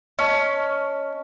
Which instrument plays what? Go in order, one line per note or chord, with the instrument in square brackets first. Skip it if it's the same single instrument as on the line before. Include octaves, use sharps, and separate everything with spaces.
[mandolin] C#4 [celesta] D#5 A5 C#6